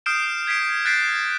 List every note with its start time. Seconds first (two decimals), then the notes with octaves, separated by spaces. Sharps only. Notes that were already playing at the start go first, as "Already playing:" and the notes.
0.06 D#6 F6 G6 C7 D7 E7
0.47 G#6 B6 C7 D7
0.85 F#6 G6 A6 B6 C7 D7